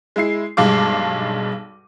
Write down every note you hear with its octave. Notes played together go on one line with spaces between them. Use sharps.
G#3 E4 C7
B1 G2 G#3 F5 D6